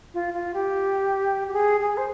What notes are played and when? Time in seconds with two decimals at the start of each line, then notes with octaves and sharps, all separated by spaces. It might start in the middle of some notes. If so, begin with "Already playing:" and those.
0.14 F4
0.34 F4
0.54 G4
1.48 G4
1.53 G#4
1.80 G#4
1.97 C5